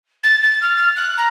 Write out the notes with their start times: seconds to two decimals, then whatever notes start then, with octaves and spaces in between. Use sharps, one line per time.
0.23 A6
0.42 A6
0.61 F6
0.76 F6
0.95 F#6
1.17 A#5